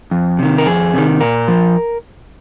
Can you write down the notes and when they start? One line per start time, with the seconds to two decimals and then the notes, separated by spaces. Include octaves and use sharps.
0.11 F2
0.39 C3 D#3
0.58 A#4
0.67 F2 G#4
0.94 C3 D#3
1.21 A#2 A#4
1.48 F3